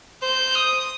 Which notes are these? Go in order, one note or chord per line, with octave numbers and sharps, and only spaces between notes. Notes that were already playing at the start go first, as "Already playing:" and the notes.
C5 G6
D#6